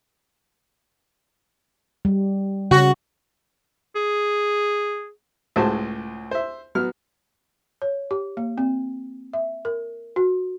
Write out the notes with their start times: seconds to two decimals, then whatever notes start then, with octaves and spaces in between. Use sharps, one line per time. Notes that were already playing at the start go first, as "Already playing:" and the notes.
2.05 G3
2.71 C#3 F#4
3.95 G#4
5.56 C#2 A2 F#4 G#4 C5 A5
6.31 C5 E5
6.75 F#3 B3 F6
7.82 C#5
8.11 G4
8.37 A#3
8.58 C4
9.33 E5
9.65 A#4
10.16 F#4